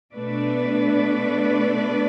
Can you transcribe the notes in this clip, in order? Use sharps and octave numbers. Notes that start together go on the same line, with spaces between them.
B2 A3 D4 B4 D5